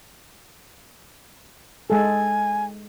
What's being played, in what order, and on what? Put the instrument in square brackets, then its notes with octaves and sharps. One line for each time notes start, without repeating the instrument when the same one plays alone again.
[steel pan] G#3 A4 [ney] G#5